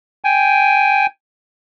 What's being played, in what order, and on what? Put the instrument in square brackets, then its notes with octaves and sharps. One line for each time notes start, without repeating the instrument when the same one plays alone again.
[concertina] G5 G#5